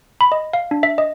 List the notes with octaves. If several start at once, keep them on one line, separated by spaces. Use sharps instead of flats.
B5
D#5
F5
D4
E5
D#5